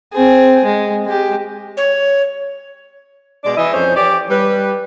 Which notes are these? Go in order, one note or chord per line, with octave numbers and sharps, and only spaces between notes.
C4 G#4
G#3
G#3 G4
C#5
B2 G#3 D5
E3 E4 D#5
F2 C#4 C5
E3 G4 C#5 D5
G3 B4